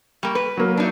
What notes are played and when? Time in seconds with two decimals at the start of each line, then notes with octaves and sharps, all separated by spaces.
0.23 G3 A#3
0.35 B4
0.57 F#3 A#3
0.77 D4 D#4